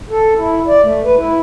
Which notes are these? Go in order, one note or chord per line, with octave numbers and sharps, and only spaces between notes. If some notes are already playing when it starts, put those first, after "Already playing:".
A4
E4
D5
A3
B4
E4